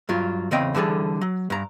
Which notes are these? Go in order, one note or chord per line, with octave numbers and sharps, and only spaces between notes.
G2 F#3 F4
E2 C#3 C4 D#5 G5
D3 E3 G3 G#4 A4
F#3
G2 A#5